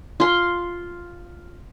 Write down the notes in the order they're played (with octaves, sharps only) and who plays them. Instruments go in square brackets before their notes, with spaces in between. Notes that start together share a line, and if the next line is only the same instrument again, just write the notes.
[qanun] F4 C6